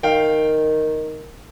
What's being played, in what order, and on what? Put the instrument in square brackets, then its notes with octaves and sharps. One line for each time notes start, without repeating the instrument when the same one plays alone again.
[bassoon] D#3 [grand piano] F5 G5